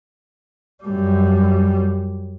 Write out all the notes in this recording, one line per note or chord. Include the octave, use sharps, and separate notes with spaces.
F#2 G3